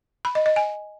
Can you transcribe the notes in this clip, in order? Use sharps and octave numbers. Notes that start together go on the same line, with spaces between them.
B5
D#5
D#5
G#5